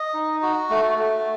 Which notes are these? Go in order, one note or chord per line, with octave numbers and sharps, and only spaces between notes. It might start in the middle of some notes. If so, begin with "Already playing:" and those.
Already playing: D#5
D#4
F#4
A3
A3